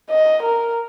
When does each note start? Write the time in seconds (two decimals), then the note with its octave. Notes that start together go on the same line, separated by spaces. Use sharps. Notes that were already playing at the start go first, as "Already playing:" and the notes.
0.10 D#5
0.43 A#4